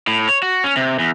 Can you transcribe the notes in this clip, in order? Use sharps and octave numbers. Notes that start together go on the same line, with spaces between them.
A2
C#5
F#4
C#4
C3
E2